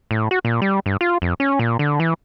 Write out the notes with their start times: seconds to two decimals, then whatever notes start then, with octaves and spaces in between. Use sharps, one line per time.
0.11 A2
0.31 F#4
0.45 A#2
0.62 G3
0.86 G2
1.01 F4
1.22 F2
1.40 C#4
1.59 A#2
1.79 D3
2.00 E3